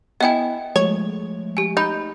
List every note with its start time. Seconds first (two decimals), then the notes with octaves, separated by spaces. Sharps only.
0.20 B3 E4 D#5 G5 G#5
0.76 F3 G#3 A3 C#5
1.57 G4 G#5
1.77 D#4 B5 G6